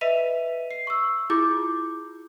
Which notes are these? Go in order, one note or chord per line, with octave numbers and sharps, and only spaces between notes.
B4 D#5 E5 B6 D#7 F7
C7
C#6 E6
E4 F4 G#4 D6 G6